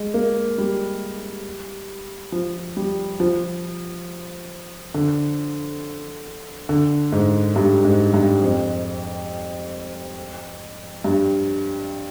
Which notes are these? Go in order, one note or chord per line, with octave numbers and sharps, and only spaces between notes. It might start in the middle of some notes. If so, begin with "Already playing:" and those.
Already playing: G#3
A#3
G3
F3
G3
F3
D3
D3
G#2
G2
G#2
G2
F2
G2